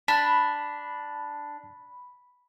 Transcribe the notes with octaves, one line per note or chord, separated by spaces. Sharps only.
D4 A5 B5